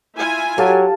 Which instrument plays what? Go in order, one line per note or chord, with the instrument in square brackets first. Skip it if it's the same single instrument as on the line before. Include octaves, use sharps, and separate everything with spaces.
[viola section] E4 F4 G#5
[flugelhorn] F#3 [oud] G4 [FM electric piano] A4 F5 A5